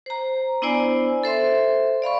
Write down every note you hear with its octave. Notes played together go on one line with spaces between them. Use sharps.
C5 A#5
B3 D4 E4 C5 D5 G#5
A4 C5 E5 C6
D5 F5 B5 C#6